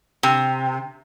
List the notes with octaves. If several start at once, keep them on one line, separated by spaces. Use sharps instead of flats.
C3